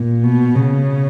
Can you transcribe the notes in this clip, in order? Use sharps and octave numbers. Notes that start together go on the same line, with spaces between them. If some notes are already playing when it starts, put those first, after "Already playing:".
Already playing: A#2
B2
C#3